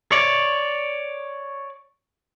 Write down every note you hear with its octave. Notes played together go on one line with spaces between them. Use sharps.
C#5 D5